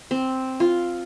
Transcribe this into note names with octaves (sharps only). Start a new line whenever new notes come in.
C4
F4